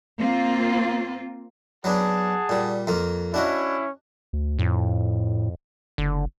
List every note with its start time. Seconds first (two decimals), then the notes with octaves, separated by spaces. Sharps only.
0.18 A#3 C4 F4
1.84 F#3 B3 D4 G#4 F#5 A5
2.49 A#2 G3
2.87 F2 A#3 F4
3.34 C#4 D4 E4 F#4 D#5
4.33 D2
4.59 F2 A2
5.98 F#1 D3